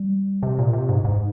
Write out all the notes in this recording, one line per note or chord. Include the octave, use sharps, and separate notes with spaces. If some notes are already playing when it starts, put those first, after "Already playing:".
Already playing: G3
C3
A#2
C3
G#2
G#2